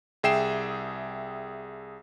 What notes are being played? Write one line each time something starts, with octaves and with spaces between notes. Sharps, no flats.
C2 G#4 E5 G5 C7 E7